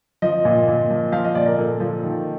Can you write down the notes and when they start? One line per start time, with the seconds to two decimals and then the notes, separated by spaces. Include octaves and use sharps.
0.22 F3 D#5
0.45 A#2
0.68 A#2
0.90 F3
1.12 F3 F5
1.24 D#5
1.35 A#2 D5
1.46 A#4
1.58 A#2 A4
1.80 F3
2.03 D#3